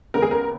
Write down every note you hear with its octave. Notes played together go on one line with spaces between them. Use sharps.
D#2 C#3 G#3 B3 A#4
G#4
A#4